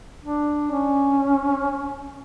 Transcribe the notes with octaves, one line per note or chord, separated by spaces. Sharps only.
D4
C#4